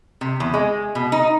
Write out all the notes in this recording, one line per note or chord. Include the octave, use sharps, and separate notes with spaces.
C3
E2
G#3
B2
D#4